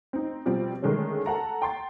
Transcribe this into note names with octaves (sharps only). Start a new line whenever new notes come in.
C4 D#4
B2 F3 G3 C4
D3 D#3 G#3 A3 C#4
A4 F#5 A#5
G5 C6 A6